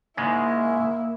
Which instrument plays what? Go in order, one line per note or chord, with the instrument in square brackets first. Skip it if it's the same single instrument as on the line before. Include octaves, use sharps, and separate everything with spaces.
[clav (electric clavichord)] G#2 C#3 G#3 [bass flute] A#3 [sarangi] E4